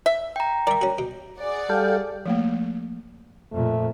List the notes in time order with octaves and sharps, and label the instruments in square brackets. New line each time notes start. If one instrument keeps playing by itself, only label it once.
[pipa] E5
[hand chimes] G5 A#5
[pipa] A#4 [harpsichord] D5 E5
[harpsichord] C#4 F#4
B2
[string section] G#4 D5 F#5
[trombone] G3 [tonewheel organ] A4 F5 G5
[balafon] F3 A3 A#3
[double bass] F2 A#2 [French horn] A3